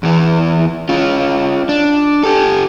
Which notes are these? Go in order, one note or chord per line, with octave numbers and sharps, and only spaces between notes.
E2 E3
C#4 F4
D4
G4 A4